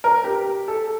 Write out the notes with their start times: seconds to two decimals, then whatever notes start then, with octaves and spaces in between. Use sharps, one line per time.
0.04 A#4
0.24 G4
0.68 A4